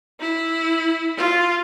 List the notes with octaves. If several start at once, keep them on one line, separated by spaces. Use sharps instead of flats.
E4
F4